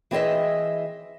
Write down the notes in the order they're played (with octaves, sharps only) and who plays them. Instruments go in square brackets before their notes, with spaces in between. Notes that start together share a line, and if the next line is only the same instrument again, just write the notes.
[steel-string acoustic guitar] E3 C4 G#4 D#5 E5